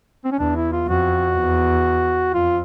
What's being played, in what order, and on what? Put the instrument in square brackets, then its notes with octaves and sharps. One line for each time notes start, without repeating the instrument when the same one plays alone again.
[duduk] C4
C#4
[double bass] E2 [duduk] D4
[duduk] E4
F4
[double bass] F2 [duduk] F#4
[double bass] E2
[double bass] F2 [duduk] F4